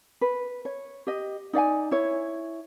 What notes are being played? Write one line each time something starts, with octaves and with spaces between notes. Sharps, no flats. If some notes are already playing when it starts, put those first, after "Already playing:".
B4
C#5
G4 D#5
D#4 D5 F5 G#5
E4 C#5